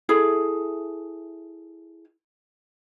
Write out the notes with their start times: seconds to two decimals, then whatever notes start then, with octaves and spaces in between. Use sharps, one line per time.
0.09 E4 G#4 A4